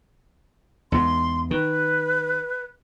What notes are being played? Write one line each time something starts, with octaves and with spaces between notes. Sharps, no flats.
E2 G#2 C6
D#3 B4